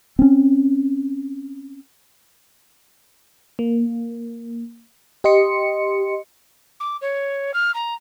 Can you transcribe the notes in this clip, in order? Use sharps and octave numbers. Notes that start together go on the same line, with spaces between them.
C4 C#4
A#3
G4 D#5 C6 C#7
D6
C#5
F6
A#5